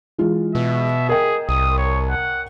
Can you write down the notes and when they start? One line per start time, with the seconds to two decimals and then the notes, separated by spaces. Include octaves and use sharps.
0.18 E3 G#3 F4
0.55 B2 E5
1.09 G#4 A#4 D#5 G5
1.49 C2 D#6
1.78 C#5
2.11 F#5